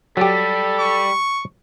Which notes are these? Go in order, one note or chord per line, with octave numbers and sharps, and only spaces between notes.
F#3 G3 G4 A4
C#6